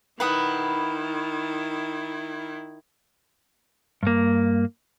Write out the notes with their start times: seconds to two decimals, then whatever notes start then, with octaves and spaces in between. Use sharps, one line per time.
0.20 D#3 E4 B4 F5 F#5 B5 D#6
4.03 G2 A#3